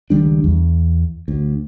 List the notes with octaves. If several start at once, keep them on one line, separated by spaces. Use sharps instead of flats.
C#2 D#3 G3 D4
E2
D2